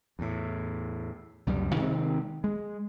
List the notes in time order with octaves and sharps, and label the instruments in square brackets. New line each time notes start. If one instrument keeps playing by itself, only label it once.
[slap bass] E2 A2
C#2 F#2 C3 G3
C3 D#3 G#3 C4
G#3